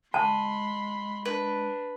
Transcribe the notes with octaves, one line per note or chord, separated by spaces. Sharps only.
G#3 A5 B5 C6
D4 B4